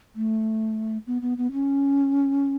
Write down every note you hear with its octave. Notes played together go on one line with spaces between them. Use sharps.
A3
B3
B3
B3
C#4